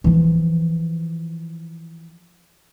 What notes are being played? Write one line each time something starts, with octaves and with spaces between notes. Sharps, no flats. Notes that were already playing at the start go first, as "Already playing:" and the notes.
E3 F3